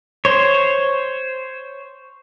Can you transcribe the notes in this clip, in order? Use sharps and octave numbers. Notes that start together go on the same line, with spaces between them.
C5 C#5